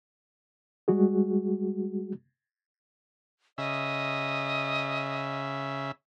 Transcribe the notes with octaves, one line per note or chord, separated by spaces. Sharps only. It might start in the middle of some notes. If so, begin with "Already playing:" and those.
G3 G#3 F#4 G#4
C#3 D#5 E5